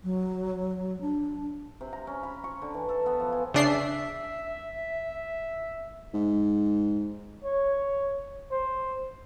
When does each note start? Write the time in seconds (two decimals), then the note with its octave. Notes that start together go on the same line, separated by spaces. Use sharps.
0.04 F#3
1.01 D4
1.81 C3
1.93 A#5
2.07 C#4
2.23 B5
2.44 C#6
2.62 D3
2.74 E3
2.89 A4
3.06 B3
3.20 F3
3.32 G#5
3.54 C#3 D4 E5 C7
6.14 G#2
7.44 C#5
8.51 C5